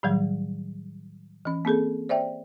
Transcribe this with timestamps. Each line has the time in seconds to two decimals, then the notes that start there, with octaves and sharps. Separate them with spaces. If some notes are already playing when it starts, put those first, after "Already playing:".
0.03 A2 D#3 F#3 G3
1.45 E3 C#4
1.65 A#3 C4 G#4 A4
2.09 C5 D5 E5 G5